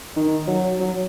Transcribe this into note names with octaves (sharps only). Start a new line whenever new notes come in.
D#3
F#3
F#3